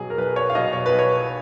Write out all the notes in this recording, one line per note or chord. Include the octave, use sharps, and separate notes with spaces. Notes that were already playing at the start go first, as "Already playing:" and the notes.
Already playing: B1 B2 F#3 G#4
A#4
B1 B4
C#5
F5
B2 F#3 D#5
C#5
B4
B1
C#5